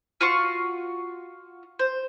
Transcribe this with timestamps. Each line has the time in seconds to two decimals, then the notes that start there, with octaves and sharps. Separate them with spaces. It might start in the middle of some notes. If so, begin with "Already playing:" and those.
0.21 F4 F#4 C6 C#6
1.79 C5